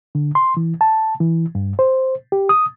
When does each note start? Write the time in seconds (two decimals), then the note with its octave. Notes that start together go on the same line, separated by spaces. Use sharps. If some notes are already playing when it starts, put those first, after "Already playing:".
0.15 D3
0.35 C6
0.57 E3
0.81 A5
1.20 E3
1.55 G2
1.79 C5
2.32 G4
2.49 D#6